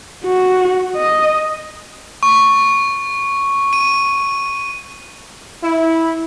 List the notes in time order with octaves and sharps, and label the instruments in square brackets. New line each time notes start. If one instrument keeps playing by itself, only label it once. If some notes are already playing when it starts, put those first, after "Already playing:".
[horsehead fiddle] F#4
D#5
[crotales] C#6
D#7
[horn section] E4